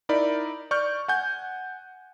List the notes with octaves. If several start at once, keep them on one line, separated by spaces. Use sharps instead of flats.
D#4 E4 A#4 D5 B5
D5 C#6 F6 G6
F#5 G#5 G6